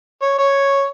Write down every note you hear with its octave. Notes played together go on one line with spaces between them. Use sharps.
C#5
C#5